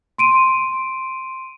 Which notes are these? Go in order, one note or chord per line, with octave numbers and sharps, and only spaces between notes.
C6 D7 D#7